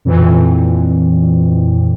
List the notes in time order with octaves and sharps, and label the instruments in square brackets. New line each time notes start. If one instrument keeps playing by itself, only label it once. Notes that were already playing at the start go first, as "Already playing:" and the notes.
[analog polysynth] F2 A#2 E3